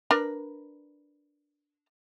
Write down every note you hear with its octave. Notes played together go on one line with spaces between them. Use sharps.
D4 A#4 B4